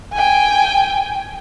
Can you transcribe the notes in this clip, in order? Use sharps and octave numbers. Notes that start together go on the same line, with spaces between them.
G5 G#5